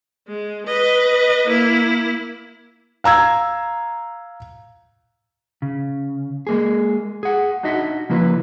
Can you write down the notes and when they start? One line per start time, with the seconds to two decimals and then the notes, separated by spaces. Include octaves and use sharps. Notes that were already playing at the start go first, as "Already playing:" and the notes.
0.27 G#3
0.66 B4 D#5
1.47 A#3 E4
3.04 F5 A#5 E6 G#6
5.62 C#3
6.47 G#3 A#3 G#4
7.23 G#4 F#5
7.63 D4 D#4 F#4 D#5 E5 F#5
8.09 C#3 F3 A#3 E4 B4